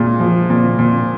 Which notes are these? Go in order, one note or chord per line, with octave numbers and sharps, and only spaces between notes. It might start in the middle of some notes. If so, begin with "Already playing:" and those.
Already playing: A#2 G#3
F3
A#2
A#2